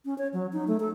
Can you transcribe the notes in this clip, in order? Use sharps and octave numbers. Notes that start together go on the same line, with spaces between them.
C#4
C#5
F#3
D#4
A3
A4